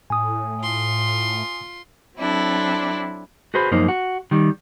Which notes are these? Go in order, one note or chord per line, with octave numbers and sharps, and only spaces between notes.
A2 G#5 D#6
F4 C6
F#3 C4 D4 E4 A4
F#4 G#4 B4 C5
F#2 F3 A#3 D#4 C5
F#4
D#3 G3